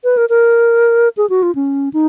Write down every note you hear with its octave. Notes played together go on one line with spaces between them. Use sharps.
B4
A#4
A#4
G#4
F#4
F4
C#4
D#4